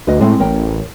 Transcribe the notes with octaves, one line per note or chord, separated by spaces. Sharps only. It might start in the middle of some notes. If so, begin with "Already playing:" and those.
D2 B4 D#5
A2 G#3 C4
A1 A#4 C#5 G5